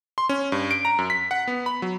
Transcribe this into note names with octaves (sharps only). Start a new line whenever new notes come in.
C6
C#4
G2
D7
A#5
F#2
B6
F#5
B3
B5
F#3